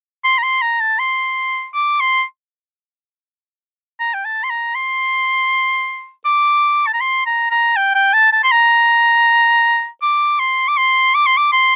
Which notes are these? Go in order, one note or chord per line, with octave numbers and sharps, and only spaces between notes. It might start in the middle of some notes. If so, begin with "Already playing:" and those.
C6
A#5
C6
A#5
A5
C6
D6
C6
A#5
G5
A5
C6
A#5
C6
D6
A5
A#5
C6
A#5
A#5
G5
G5
A5
A5
C6
A#5
D6
C6
D6
C6
D6
C6
D6
C6